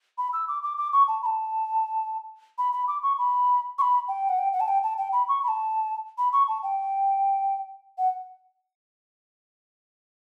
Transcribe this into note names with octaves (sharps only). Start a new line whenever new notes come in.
B5
E6
D6
D6
D6
C#6
A5
B5
A5
B5
B5
D6
C#6
B5
C#6
B5
G5
F#5
G5
F#5
A5
G5
A5
G5
B5
C#6
B5
A5
B5
C#6
A5
G5
F#5